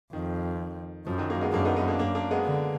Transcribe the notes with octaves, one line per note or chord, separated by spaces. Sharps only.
F2 D#3
F#2 F3
D#3 F#3
F#3 A#3
G#3 B3
F#2 A#3 D4
B3 D#4
B3 D#4
A#3 D4
F#2 A#3 D4
A#3 D4
G#3 B3
D3